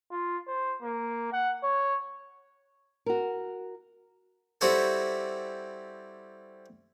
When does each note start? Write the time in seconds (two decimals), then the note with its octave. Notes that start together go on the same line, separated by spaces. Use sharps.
0.11 F4
0.47 C5
0.82 A#3
1.33 F#5
1.63 C#5
3.06 F#4 A#4
4.61 G3 C4 E4 F#4 G4 A4